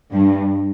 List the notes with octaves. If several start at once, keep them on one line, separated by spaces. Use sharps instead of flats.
G2